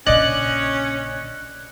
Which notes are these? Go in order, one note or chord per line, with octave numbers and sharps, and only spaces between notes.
A#1 C#3 C#4 D5 D#5 F#6